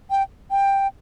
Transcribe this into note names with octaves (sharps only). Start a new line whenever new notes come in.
G5
G5